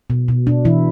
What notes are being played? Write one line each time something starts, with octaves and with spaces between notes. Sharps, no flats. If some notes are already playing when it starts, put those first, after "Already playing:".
B2
B2
B2 D4
B2 E3 E4